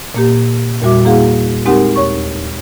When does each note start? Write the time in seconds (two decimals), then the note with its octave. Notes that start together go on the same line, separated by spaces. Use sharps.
0.15 A#2 A#3 G4
0.82 E2 A#2 G3 F#4 E5 D6
1.05 A#3 E4 F#4 G#4 F5 F#5
1.66 G#3 C4 D#4 G4 A#4 F#5
1.96 D#2 C#5 C#6